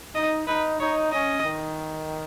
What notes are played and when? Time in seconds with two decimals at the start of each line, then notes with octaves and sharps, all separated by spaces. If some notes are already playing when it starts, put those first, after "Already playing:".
0.15 D#4 D#5
0.48 D#4 B4
0.80 D#4 C#5
1.12 C#4 D#5
1.45 D#3